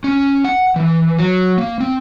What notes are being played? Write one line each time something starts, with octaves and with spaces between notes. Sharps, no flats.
C#4
F#5
E3
F#3
A#3
C4